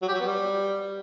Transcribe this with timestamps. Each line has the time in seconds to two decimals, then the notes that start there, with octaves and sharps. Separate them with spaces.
0.02 F#3
0.08 G4
0.14 F#3
0.20 B3
0.26 G3